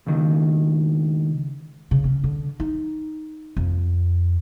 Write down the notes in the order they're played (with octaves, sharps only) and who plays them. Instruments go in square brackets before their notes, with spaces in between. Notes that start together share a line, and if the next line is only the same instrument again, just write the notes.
[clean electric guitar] C#2 D#3
[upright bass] C#3
C#4
D3
D#4
F2